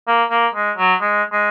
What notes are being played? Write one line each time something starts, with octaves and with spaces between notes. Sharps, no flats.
A#3
A#3
G#3
F#3
G#3
G#3